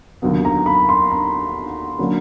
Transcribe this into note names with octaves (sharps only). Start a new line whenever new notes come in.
D#2 D3 F#3 B3
A#5
B5
C6
A#5
D3 F#3 A#3 C#4